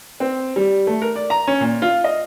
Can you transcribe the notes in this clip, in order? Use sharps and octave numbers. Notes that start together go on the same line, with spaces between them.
C4
G3
A3
A#4
D5
A#5
C#4
A#2
F4
D#5